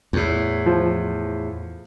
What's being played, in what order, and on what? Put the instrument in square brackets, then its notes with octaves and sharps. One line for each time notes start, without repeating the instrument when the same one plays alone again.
[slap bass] E2 A2
[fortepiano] F3